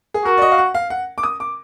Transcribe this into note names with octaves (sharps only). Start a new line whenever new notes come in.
G#4
F#4 A#4
D5
D#5
F5
F#5
F5
F#5
D6
D#6
D6